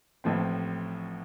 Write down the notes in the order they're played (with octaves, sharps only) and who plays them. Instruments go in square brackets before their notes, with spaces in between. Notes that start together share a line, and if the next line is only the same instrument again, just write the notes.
[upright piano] A1 A2 F3 C4